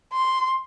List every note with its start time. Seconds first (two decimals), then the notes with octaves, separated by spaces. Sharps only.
0.13 C6